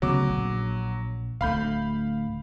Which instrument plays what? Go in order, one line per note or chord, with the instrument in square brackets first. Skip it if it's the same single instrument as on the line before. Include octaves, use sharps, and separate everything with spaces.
[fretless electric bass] D2 C#3 B3 [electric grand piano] F#3 D6
[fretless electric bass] A#1
[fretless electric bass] D1 D2 A3 [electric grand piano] F5 B5 G6